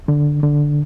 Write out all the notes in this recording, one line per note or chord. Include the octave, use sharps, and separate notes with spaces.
D3
D3